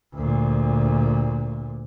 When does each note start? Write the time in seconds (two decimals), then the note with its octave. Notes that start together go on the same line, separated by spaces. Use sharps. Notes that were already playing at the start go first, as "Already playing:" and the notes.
0.15 D2 A#2